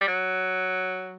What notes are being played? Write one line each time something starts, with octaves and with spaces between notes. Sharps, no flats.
G3
F#3